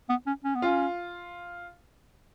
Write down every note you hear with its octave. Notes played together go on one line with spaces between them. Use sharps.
B3
C#4
C#4
B3
C#4 F4